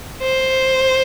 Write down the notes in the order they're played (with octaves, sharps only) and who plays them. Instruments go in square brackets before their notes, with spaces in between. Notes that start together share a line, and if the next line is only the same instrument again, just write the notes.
[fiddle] C5